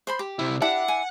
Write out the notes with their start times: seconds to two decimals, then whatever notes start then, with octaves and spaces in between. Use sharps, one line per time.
0.07 C5 B5 C6
0.19 G4
0.39 C3 E4
0.62 D4 E4 G4 E5 F#5
0.88 G#5